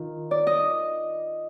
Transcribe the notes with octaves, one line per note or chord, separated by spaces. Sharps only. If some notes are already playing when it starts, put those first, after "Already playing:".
Already playing: D#3 F4
D5
D#5